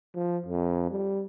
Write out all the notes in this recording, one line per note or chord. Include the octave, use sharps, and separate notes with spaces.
F3
F2
G3